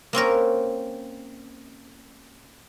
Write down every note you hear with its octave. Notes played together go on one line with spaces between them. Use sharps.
A#3 C4 C#4 A#4